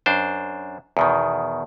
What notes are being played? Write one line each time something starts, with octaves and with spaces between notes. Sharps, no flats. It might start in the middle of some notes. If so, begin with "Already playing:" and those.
F#2 D4 C5
E2 B2 D#3